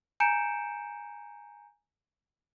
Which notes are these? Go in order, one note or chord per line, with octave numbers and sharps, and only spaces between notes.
G#5 A#5 G6 C#7 D7 E7